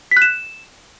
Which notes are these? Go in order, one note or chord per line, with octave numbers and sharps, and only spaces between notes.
B6
F#6
E7